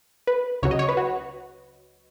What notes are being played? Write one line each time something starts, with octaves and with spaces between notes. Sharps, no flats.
B4
C#2 C#3 F#3 C#5
D#5
C#5
B4
F#4